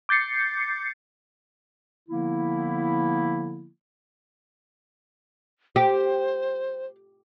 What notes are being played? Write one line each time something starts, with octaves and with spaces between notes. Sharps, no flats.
D6 G6 A6 C7 C#7
D3 F3 A#3 B3 E4
G4 C5